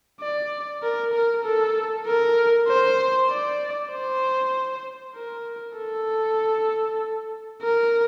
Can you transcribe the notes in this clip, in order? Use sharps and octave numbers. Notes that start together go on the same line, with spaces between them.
D5
A#4
A#4
A4
A#4
C5
D5
C5
A#4
A4
A#4